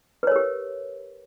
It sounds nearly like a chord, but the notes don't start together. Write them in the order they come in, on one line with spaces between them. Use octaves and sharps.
B4 C#5 A#4 G4